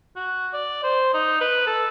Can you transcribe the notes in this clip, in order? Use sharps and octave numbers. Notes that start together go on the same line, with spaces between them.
F#4
D5
C5
D#4
B4
A4